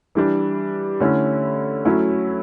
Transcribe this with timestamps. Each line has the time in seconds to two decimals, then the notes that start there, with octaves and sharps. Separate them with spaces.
0.15 E3 G3 D4
1.00 D3 A3 C#4 E4
1.85 F#3 A3 C#4 E4